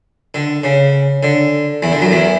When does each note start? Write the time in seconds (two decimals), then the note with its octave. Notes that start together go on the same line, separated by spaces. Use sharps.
0.34 D3
0.63 C#3
1.23 D3
1.82 E2 E3
1.92 D3
2.01 F#2 F#3
2.11 E2 E3